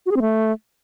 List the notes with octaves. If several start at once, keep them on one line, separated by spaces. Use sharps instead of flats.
F#4
G#4
C4
A3